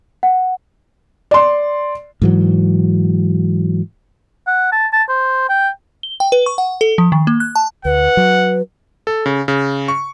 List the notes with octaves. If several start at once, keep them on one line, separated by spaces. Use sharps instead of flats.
F#5
D5 C6
G#2 E3 F#3
F#5
A5
A5
C5
G5
G7
G5
B4
C#6
F#5
A4
F3
D#3
A#3
F#6
A5
D2 B4 F#5
F#3
A4
C#3
C#3
C#6